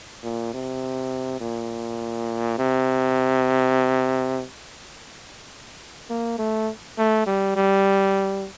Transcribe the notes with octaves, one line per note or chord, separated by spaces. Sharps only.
A#2
C3
A#2
C3
A#3
A3
A3
G3
G3